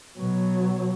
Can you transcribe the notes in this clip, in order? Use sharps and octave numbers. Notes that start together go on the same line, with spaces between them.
B2 F#3